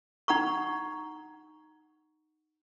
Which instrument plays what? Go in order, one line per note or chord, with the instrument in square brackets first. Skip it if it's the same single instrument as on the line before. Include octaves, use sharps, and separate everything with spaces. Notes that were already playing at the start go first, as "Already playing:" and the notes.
[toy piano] D#4 F#5 A#5 C#6